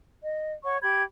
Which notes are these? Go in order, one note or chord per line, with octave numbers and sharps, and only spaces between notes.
D#5
C#5 F#5 C#6
G4 B5 G#6